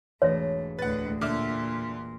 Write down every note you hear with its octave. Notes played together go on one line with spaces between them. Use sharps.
E1 G#2 A3 C#5 A#6
D2 A2 B4 F#5 A6
A#2 D3 E5 D6 F6